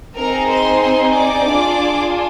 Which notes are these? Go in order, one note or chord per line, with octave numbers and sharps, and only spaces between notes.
C4 D#4 G#4 A#4 A#5
C5 C6
C5 C6
D5 D6
D4 F4 G#4